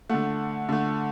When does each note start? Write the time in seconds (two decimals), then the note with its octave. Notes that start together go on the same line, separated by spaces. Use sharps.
0.10 D3 A3 F#5
0.69 D3 A3